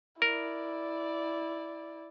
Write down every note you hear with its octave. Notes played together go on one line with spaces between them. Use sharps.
E4 A#4 D5